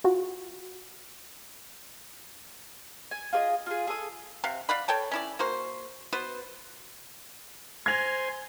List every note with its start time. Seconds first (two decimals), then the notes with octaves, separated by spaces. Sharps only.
0.04 F4 F#4
3.11 G#5
3.33 F4 G#4 D5 D#5
3.66 F4 G#4
3.87 G#4 A4 D#6
4.44 C3 F5 F#5
4.69 D5 F5 F#5 B5
4.88 A4 C#5 G5 A5
5.11 C#4 E4 D5
5.39 A#3 F#4 C5
6.13 B3 F#4 B4 C5
7.86 C5 G#5 C6 G#6 A#6 F7